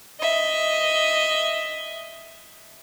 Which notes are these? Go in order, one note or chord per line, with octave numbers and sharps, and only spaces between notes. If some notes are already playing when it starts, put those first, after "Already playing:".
D#5 E5